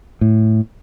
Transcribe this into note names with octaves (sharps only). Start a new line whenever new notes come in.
A2